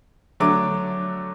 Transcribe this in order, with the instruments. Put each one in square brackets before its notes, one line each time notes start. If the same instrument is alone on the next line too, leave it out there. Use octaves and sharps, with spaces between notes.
[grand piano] D3 F#3 A3 D6